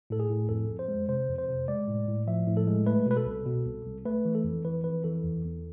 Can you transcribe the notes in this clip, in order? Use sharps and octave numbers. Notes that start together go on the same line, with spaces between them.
A2 A4
G#4
A2
F2 A4
F2
C5
G#3
C3 C5
F2
C5
C3
G#3 D5
A2
A2
F3 E5
A2
A4
G#3
A3 B4
B2 B4
A4
C2
B2
C2
C2
A3 B4
E3
A4
F2
E3 B4
F2 B4
E3 A4
E2
E2